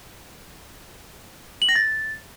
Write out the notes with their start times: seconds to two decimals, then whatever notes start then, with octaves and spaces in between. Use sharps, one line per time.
1.62 F#7
1.69 A#6
1.76 A6